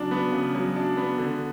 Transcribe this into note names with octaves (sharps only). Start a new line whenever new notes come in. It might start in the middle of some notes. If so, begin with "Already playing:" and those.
Already playing: C#3 F#3 D4
B3
C#3
F#3
D4
B3
D3